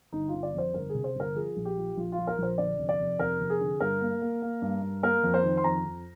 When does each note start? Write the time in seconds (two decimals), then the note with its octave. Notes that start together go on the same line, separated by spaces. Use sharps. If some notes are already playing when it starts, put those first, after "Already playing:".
0.12 G1 D#4
0.28 F4
0.33 G1
0.43 D5
0.54 F2 C5
0.73 G1 A#4
0.89 G#4
0.94 C3
1.04 C5
1.15 G1 A#4
1.35 F3 G#4
1.56 A#1
1.65 G4
1.77 F3
1.97 A#1 F4
2.12 F4
2.18 F3
2.27 A#4
2.38 A#1 C5
2.58 D3 D5
2.78 F1
2.89 D5
2.99 F1
3.19 F1 A#4
3.40 F1
3.50 G#4
3.61 D3
3.80 G2 A#4
4.01 A#3
4.22 A#3
4.42 A#3
4.62 G2
4.82 G2
5.03 A#3 A#4
5.23 F2
5.34 C5
5.43 D#3
5.57 C6
5.64 F2 A#5
5.85 F2